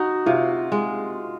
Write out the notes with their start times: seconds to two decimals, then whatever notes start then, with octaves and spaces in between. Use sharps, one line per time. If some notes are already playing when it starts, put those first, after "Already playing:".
Already playing: D#4 F#4
0.26 C3 F4
0.72 G#3